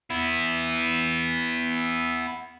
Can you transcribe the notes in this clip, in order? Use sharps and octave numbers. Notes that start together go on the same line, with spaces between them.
B3 E4